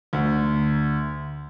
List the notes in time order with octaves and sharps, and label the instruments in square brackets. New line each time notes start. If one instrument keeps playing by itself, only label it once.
[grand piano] D2